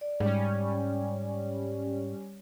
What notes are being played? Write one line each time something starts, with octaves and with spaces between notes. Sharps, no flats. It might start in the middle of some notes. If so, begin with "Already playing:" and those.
D5
G#2 G3 C#4